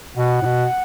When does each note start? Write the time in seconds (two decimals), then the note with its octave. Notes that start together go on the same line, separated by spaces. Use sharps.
0.17 B2 F#5
0.42 A2
0.46 B2